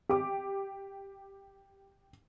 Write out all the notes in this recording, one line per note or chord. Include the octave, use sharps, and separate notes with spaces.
G4 D6